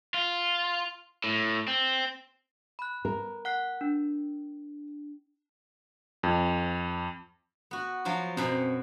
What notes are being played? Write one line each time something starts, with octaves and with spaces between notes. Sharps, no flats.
F4
A2
C4
B5 F#6
A#4
F#5 F#6 C7
D4
F2
B3 F#4
F3 F#3 F4
F#2 B2 C4 B5